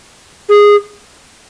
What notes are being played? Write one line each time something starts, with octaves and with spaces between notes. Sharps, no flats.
G#4